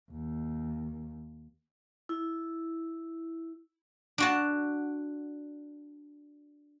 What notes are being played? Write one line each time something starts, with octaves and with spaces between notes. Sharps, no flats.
D#2
E4
D4 F#4 A5